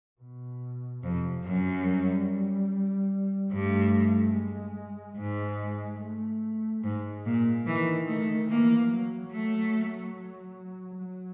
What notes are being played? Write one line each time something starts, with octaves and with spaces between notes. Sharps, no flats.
B2
F2 C3
F#2 F#3
G3
G2 A3
G#3
G#2 G#3
A3
G#2 G#3
A#2
D#3 E3
A3
E3 A#3
F#3
A3
F#3